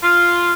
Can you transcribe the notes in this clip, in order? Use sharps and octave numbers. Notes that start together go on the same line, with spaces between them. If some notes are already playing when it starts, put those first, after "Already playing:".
F4